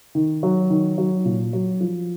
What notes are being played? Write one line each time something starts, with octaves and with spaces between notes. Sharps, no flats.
D#3
F#3
D#3
F#3
A#2
F#3
F3